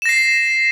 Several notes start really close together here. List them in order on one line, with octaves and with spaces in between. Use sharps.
E7 A#6 C7